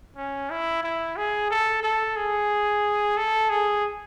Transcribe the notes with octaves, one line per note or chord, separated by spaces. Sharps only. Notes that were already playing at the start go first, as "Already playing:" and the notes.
C#4
E4
E4
G#4
A4
A4
G#4
A4
G#4